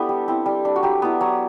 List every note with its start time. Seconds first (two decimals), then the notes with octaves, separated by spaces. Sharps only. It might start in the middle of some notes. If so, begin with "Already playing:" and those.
Already playing: B3 D4 E4 G4 A4 B4
0.09 G3
0.28 C4 E4
0.46 G3
0.65 D4
0.76 F#4
0.83 F#3 G4
1.02 B3 E4
1.21 F#3